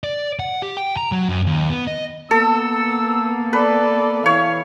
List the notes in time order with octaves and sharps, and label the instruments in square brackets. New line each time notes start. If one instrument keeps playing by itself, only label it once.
[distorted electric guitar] D5
F#5
G4
G5
A#5
F#3
F#2
D#2
B3
D#5
[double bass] A#3 B3 [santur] A4 [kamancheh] E6
[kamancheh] A4 D5 [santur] B4
[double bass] E3 [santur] C#5 [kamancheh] F5